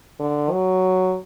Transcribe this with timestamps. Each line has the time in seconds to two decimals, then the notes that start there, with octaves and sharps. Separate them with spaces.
0.19 D3
0.52 F#3